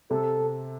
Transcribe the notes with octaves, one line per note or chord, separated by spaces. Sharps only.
C3 A4